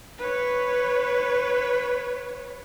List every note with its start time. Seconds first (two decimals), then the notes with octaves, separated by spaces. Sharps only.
0.18 B4 C#5